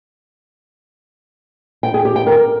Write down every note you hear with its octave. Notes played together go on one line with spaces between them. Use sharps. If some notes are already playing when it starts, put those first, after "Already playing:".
G5
G#4
G4
G5
A#4